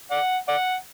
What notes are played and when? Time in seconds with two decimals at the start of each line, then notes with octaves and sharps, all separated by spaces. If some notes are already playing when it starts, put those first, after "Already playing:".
0.11 D5 F#5
0.48 D5 F#5